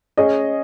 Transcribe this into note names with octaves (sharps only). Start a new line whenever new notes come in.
C#4 G#4 D#5